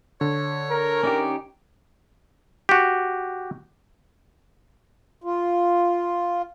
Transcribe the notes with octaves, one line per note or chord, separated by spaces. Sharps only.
D3 C#5
A#4
C#4 D#4 G4 D5
F#4 G4
F4